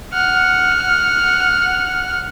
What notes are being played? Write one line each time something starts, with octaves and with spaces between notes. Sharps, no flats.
F#5 F6